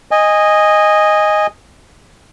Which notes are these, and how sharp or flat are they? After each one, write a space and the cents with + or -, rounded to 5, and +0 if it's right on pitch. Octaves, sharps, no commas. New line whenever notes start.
D#5 +0 G#5 -15